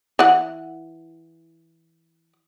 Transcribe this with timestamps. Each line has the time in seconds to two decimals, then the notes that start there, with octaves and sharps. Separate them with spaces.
0.19 E3 F#5